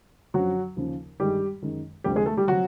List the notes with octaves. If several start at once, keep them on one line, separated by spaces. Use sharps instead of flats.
F#2 D3 F3 F#3 F#4
D#2 C#3 F3
G2 D#3 G3 G#3 G4
F#2 D#3 G#3
D2 C3 F3 G3 A3 G4
G#3 G#4
A3 A4
G3 G4
C3 F3 F#3 F#4